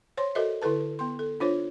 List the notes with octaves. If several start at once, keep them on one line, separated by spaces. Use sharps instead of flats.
C5 C#5 C6
F#4 A4 A#4 C5 D#5 E5
D3 E4 A4 B4 A5
B3 C6
A4
D4 F4 C5 C#5